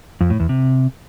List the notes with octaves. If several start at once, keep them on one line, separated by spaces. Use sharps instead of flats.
F2
A2
E2
C3